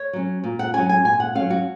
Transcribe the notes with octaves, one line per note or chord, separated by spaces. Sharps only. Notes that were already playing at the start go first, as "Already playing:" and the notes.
Already playing: C#5
F#3 C#4
A#2
F#5
F#3 C#4 G#5
G#5
A#2 G#5
F#5
F#3 C#4 F5
F#4